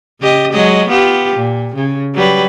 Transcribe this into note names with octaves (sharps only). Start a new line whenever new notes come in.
C#3 G4 D#5
F#3 G#3 D#5
B3 F4 G4
A#2
C#3
F#3 G3 B4